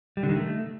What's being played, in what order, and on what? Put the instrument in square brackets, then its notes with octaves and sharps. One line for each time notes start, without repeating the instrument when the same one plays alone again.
[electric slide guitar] G3
D3
D#3
A3